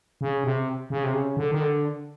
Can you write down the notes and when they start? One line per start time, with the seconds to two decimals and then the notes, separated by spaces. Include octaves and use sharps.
0.21 C#3
0.44 C3
0.90 C#3
1.04 C3
1.14 C#3
1.37 D3
1.51 D#3
1.60 D3